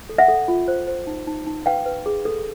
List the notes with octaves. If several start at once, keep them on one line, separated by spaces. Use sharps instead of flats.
A4
E5 F#5
A4
F4
C5
C5
D#4
D#4
D#4
B4 F5 G5
B4
G#4
A4